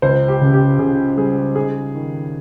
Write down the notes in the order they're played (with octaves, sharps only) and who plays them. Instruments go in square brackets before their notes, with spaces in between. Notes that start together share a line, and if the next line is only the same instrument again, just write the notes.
[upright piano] C#2 C5
G4
C#3
G4
C#3 G#4
G3 G#4
D#4 G#4
D#3